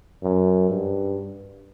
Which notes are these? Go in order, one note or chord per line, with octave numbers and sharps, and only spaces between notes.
F#2
G2